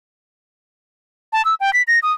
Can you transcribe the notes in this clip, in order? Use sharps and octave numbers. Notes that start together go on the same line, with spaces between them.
A5
E6
G5
B6
A#6
D#6